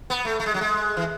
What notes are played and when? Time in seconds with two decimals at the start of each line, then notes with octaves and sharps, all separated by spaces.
0.10 B3
0.25 A3
0.40 A3
0.46 G#3
0.54 F#3
0.61 G#3
0.97 E3